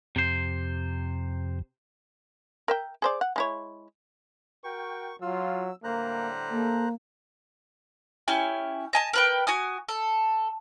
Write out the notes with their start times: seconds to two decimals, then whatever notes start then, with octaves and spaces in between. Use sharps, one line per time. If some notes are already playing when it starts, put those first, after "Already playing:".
0.16 F2 C3 C5
2.68 A#4 E5 G5
3.02 G#4 C5 D5
3.21 F#5
3.36 G#3 E4 C#5
4.64 F#4 A#4 G5 C#6
5.22 F#3 F4 E6
5.84 A2 D3 G3 A#3 C5 A#5 F#6
6.51 A#3 A4
8.28 C#4 E4 G4 G#5
8.93 D#5 G#5 A5
9.13 A#4 B4 G5
9.47 F#4 G#5 D#6
9.89 A4